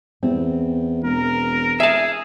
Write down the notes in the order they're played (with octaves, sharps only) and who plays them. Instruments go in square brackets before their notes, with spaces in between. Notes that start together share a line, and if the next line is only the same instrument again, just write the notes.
[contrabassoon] E2 [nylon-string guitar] C4
[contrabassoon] E1 [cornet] A#4
[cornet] G#4 [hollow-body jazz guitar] E5 A5